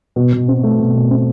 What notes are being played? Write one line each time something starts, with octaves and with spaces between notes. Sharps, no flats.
B2
B2
C4
A3
B2
B2
C4